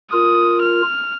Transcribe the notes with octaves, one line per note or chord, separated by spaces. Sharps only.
F4 A#4 D#6
F6